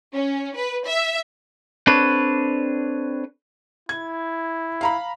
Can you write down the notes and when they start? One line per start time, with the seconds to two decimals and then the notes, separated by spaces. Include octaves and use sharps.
0.13 C#4
0.56 B4
0.86 E5
1.87 C4 D4 A4 B4 C#5
3.89 E4 G#6
4.81 F5 A#5 B5